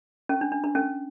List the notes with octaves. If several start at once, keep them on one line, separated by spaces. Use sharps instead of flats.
C#4
D4
D4
D4
C#4